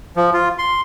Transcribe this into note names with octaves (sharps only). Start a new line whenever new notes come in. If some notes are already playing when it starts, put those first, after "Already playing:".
F3
F4
C6